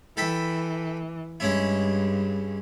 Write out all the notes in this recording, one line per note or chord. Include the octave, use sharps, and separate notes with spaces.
E3 A4 G5 B5
G2 G#3 C#4 E4